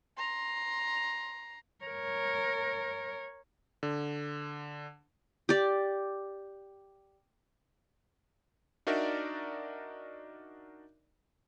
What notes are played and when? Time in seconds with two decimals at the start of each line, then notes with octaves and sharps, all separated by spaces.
0.17 A#5 C6
1.85 A#4 C#5
3.83 D3
5.49 G4 D5
8.87 D4 D#4 F#4 A#4 D5 E5